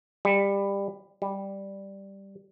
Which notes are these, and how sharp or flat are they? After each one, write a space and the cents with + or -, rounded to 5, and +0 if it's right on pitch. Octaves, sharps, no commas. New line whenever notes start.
G3 +20
G3 +0